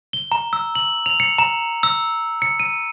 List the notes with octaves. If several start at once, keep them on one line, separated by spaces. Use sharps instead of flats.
G7
A#5
E6
F#7
F7
C#7
A#5
E6
C#7
D#7